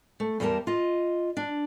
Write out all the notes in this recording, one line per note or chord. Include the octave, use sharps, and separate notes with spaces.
A3
E2 G3 G4 A#4 A5
F4 D#5
D4